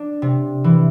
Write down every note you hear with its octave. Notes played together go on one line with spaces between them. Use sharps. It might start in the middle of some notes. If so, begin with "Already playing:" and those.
Already playing: D4
C3
E3